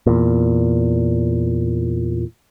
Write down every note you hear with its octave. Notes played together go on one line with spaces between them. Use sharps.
E2 A#2